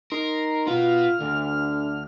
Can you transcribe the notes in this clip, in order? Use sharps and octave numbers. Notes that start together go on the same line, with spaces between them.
D#4 A#4 A#5 C6
B2 B3 F4 F6
D2 D3